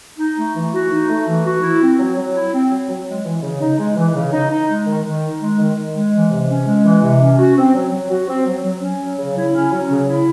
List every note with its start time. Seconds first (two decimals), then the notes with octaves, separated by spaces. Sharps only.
0.19 D#4
0.37 A3
0.55 E3
0.73 F#4
0.91 D#4
1.09 A3
1.27 E3
1.45 F#4
1.63 E4
1.81 C4
1.99 F#3
2.17 F#3
2.35 E4
2.53 C4
2.71 F#3
2.89 F#3
3.06 G#3
3.25 E3
3.43 C#3
3.60 D#4
3.78 G#3
3.96 E3
4.15 C#3
4.32 D#4
4.50 D#4
4.69 G#3
4.86 D#3
5.04 D#3
5.22 D#4
5.40 G#3
5.58 D#3
5.76 D#3
5.94 G#3
6.12 E3
6.30 C3
6.48 C#4
6.66 G#3
6.84 E3
7.02 C3
7.20 C#4
7.39 F#4
7.56 C4
7.74 F#3
7.92 F#3
8.10 F#4
8.28 C4
8.46 F#3
8.64 F#3
8.82 C#4
9.01 F#3
9.18 C#3
9.36 E4
9.53 C#4
9.72 F#3
9.90 C#3
10.08 E4